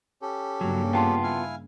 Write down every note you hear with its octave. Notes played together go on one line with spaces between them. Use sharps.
C#4 G4 A4
G2 C#3 F#3 A#3
B3 F4 G5 A5 C6
E4 F5 G#5